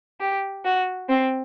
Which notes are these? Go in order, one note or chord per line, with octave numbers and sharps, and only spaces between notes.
G4
F#4
C4